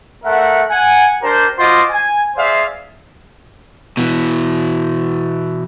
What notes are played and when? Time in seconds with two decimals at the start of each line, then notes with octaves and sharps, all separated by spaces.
0.24 A3 A#4 E5 F#5
0.69 F#5 G#5
1.22 D4 G4 A#4 C5
1.58 F4 F#4 C5 D#5 D6
1.90 G#5
2.36 G#4 C5 D5 E5 F5
3.97 B2 E3